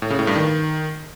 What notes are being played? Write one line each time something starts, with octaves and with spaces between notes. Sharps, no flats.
A2
C#3
A2
G2
D#3